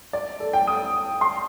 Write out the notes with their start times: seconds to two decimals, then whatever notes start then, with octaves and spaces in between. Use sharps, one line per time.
0.13 D5
0.40 A4
0.53 G5
0.67 D#6
1.21 C6